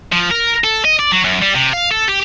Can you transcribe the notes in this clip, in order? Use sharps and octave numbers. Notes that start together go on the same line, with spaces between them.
F3
A#4
A4
D#5
D5
F#3
F#2
G3
C3
F5
A4
G4